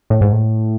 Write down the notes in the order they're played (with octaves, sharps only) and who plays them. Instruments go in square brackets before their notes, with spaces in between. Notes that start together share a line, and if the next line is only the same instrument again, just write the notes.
[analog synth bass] A2
G#2
A2